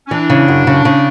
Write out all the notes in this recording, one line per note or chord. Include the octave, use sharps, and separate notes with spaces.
C#4
E3 D4
C#3
F#2
C#3
C#3